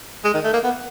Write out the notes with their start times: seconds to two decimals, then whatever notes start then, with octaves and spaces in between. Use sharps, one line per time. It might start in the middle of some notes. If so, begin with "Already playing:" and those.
0.24 G#3
0.34 D#3
0.44 A3
0.54 A#3
0.64 B3